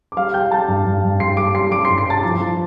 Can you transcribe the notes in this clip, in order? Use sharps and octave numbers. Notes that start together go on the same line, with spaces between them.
D6
G3 F5 F6
G3 G5 G6
G3 A5 A6
G2
G2
G2
G2 C6 C7
G3 D6 D7
G3 C6 C7
G3 D6 D7
C6 C7
G2
C6 C7
G2 A5 A6
F3 A5 A6
F3